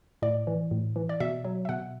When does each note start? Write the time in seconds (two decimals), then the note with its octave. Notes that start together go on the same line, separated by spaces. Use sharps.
0.22 A2 D5
0.47 E3
0.71 A2
0.96 E3
1.09 D5
1.20 B2 E5
1.45 F#3
1.65 E5
1.69 B2 F#5